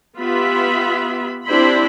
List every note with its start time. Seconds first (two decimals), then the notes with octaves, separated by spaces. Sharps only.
0.17 B3 F4 G4 E5 B5
1.46 C4 D4 E4 G4 C5 B5